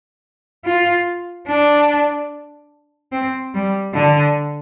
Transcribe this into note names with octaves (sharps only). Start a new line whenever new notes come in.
F4
D4
C4
G3
D3